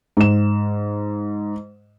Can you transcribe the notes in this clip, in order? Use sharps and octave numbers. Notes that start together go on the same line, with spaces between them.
G#2 E7